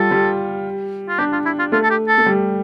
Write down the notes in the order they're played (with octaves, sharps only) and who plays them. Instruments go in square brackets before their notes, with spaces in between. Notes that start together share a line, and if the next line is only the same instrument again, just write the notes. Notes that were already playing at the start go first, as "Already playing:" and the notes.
Already playing: [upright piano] G3 F4 [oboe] A4
[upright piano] G3
[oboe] F4
[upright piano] D4 [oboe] G4
[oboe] F4
E4
F4
[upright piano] A3 [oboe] F4
[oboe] A4
G4
A4
[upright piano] A3
G3